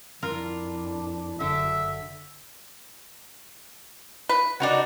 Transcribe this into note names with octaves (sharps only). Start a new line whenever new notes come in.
F2 D4 E4 F4 A#4
F#1 F#2 D3 E5
B4
D4 D#4 F#4